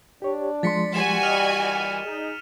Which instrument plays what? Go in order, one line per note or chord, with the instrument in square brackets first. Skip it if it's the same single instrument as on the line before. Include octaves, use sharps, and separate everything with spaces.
[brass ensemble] D4 D5 [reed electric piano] G4 C#5
[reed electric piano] F3 G#3 C6 [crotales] A6 B6 C#7
[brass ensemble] A#2 E3 G3 [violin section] F#4 G#5 [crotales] E7
[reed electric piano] D5 D#5 [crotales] F6 D#7 F7
[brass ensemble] D#4 G#4